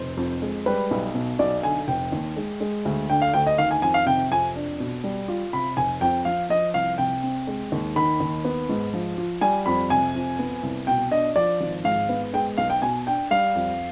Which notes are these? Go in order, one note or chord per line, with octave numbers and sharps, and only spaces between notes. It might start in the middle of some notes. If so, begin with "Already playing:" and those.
Already playing: F1 C5
F2
G#3
G3 B4
B1
B2
B1 D5
D3 G#5
F1 G5
D#2
G#3
G#3
D2
D3 G5
F5
D2 G5
D#5
D#3 F5
G#5
F2 G#5
F5
C3 G5
F2 G#5
D4
B2
G3
F4
C3 B5
F1 G#5
F2 G5
F3 F5
F3 D#5
C2 F5
C3 G5
C4
G#3
D#2
D#3 B5
D#2
B3
G#2
F3
F4
G3 G#5
F2 B5
C3 G#5
F2
B3
C2
B2 G5
D4 D#5
F3 D5
G#1
G#2 F5
B3
G#3 G5
B1 F5
G5
B2 G#5
D4 G5
G3 F5
F2